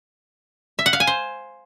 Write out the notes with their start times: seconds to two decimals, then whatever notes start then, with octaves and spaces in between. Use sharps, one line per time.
0.79 E5
0.86 F#5
0.93 F5
1.00 G#5
1.07 C5